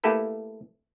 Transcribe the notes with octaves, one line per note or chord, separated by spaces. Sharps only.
A3 A#3 E4 G4 A4 B4